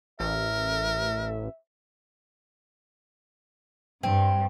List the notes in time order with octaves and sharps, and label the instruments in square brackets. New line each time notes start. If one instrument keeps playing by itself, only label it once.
[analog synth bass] A1 [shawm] A#4 [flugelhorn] E5
[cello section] G2 [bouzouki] C4